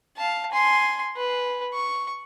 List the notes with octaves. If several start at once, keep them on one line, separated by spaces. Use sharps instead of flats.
F5 A5
G#5 C6
B4
C#6